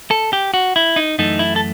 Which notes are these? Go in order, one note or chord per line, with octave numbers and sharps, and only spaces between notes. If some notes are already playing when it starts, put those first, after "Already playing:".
A4
G4
F#4
E4
D#4
F#2 E3 A3 D#4
E4
A4